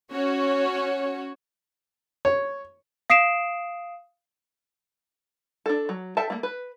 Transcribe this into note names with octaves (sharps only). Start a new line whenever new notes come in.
C#4 F#4 C#5
C#5
F5 D#6 C7 D7 E7
D4 A4
F#3
A4 E5 G5 A5
A3 A#3
B4